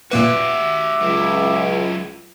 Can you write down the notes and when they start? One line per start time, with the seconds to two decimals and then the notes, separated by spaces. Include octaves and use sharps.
0.11 A#2 A#3 F#4 G4 B4 D5 E5
1.01 C#2 F#3 E4